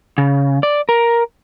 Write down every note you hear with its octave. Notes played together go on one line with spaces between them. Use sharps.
C#3
D5
A#4